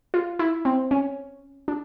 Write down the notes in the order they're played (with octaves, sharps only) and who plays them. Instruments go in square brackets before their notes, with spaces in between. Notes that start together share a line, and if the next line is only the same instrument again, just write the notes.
[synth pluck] F4
E4
C4
C#4
D4